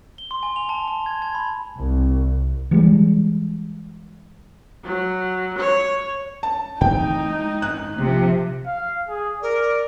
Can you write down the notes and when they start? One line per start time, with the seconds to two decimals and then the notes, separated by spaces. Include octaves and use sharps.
0.18 G7
0.31 C6
0.43 G#5
0.56 F7
0.69 A5
0.87 A5
1.06 G#6
1.22 G#6
1.35 B5
1.75 C2
2.71 E3 G3 G#3
4.84 F#3
5.59 C#5
6.43 A5
6.81 A2 E3 C4 D#4 G5
7.30 G#3
7.62 G#1 F#2 C#4 F#6
7.98 A#1 C3 F3
8.66 F5
9.09 G#4
9.42 A#4 D5